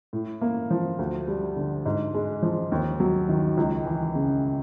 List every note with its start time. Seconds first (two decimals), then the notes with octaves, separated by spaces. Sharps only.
0.13 A2
0.41 A#3
0.70 F3
0.99 D2
1.28 G3
1.56 D3
1.85 G#2
2.14 G#3
2.43 F3
2.72 D#2
3.00 F#3
3.29 D#3
3.57 C#2
3.86 E3
4.15 C#3